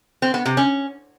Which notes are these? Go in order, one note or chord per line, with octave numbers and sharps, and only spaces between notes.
C4
B3
C3
C#4